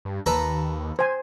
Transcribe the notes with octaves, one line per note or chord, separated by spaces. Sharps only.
G2
D#2 A4 B4 A#5
C5 G#5